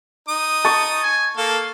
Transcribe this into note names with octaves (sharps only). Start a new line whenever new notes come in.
D#4 D#6
A5 C#6
G#5
A#3 A4 F5